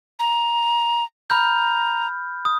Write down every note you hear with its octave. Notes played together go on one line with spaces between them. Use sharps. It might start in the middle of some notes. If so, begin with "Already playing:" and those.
A#5
A#5 B5 F6 G6
D#6